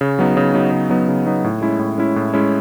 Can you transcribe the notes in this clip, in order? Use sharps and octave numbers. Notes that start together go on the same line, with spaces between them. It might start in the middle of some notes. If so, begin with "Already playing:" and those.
C#3
F#3 B3 D#4
C#3
F#3 B3 D#4
C#3
F#3 B3 D#4
C#3
F#3 B3 D#4
A2
G#3 C#4 E4
A2
G#3 C#4 E4
A2
G#3 C#4 E4